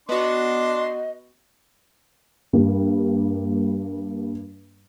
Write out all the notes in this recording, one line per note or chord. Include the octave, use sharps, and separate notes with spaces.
B3 D4 F#4 D#5 C6 D6
G2 G3 A#3